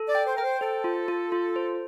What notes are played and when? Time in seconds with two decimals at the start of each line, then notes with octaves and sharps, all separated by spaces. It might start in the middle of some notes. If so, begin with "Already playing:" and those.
Already playing: A4
0.08 D5
0.15 G5
0.26 C5
0.36 A#4 G5
0.44 C5
0.61 A4 C5
0.84 F4
1.08 F4
1.32 F4
1.56 C5